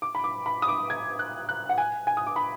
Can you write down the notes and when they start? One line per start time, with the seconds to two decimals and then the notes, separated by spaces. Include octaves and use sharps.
0.02 D6
0.15 B5
0.24 D6
0.46 B5
0.62 D#6
0.68 D6
0.90 G#6
1.19 F#6
1.49 F#6
1.69 F#5
1.78 G#5
2.07 G#5
2.17 D#6
2.27 D6
2.36 B5